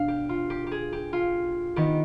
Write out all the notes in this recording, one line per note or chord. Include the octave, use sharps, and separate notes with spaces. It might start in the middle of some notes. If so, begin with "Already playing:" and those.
Already playing: B2 B3 D4 F5
G4
F4
G4
G4 G#4
G4
F4
D#3 B3 D#4 G4